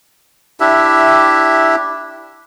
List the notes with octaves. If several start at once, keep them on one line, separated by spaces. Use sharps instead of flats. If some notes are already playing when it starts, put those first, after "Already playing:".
D4 E4 G4 E5